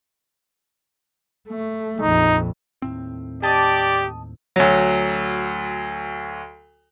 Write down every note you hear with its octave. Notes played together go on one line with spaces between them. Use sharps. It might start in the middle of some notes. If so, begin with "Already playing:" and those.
A3
A#1 F2 D#4
D#2 A2 C4
G4 D5 D#5 A5
D2 F#3